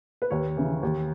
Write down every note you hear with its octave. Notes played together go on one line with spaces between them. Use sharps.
B4
D#2 C#5
C#3 E3
D#2